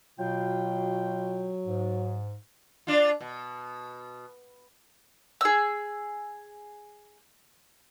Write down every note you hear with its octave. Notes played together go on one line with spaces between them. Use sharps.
B2 F#3 F4 G5
G#2
D4 F4
B2
G#4 E6